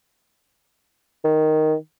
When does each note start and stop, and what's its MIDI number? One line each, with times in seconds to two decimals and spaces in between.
1.25 1.75 51